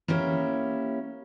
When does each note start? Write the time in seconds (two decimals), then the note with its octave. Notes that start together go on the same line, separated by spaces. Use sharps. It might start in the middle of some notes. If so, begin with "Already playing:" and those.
0.08 A#3 C#4 E4 G4 C#5